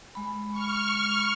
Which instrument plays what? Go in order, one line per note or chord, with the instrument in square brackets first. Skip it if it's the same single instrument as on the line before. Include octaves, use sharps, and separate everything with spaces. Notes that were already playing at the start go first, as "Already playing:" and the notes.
[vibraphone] G#3 B5
[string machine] C#6 F6